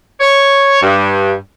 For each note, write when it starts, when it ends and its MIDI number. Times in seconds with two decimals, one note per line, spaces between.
0.20 0.80 73
0.81 1.33 43